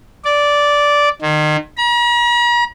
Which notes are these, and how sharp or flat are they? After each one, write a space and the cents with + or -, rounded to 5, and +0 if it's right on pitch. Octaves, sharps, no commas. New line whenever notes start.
D5 -10
D#3 -35
A#5 +45